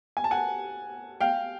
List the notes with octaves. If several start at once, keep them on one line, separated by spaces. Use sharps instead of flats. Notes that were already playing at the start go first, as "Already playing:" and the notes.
G#5
A5
F#5 G#5
F5 G5